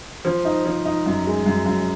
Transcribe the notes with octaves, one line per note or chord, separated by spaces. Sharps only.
F3
D#4
F3
D#4
F#2
G#3
F#2
F#2